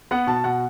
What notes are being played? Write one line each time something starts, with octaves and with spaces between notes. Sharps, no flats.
B3 F#5
B2 A5
B2 F#5